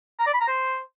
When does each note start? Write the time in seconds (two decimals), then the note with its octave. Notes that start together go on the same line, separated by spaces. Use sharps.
0.19 A#5
0.27 D5
0.34 B5
0.41 A#5
0.48 C5